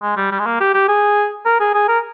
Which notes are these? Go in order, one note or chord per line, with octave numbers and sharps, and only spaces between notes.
G#3
G3
G3
G#3
A#3
G4
G4
G#4
A#4
G#4
G#4
A#4